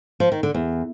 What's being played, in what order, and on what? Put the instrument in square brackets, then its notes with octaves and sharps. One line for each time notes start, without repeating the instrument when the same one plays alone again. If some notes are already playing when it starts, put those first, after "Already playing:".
[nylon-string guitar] F3
D#3
D3
E2